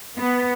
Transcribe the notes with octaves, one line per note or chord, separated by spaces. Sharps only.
B3